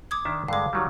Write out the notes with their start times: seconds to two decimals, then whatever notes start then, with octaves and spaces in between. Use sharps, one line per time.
0.11 D6 D#6 G#6
0.25 D#3 D4 E5
0.48 G2 D3 G#3 F5 D6
0.73 D#3 F#3 G3